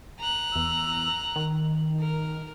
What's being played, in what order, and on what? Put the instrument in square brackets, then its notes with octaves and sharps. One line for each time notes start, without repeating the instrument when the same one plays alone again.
[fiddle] A#5 F#6
[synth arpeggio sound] E2 E6
D#3
[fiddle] A#4